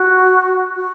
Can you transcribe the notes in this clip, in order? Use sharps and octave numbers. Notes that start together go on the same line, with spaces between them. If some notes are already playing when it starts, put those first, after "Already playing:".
Already playing: F#4
F#4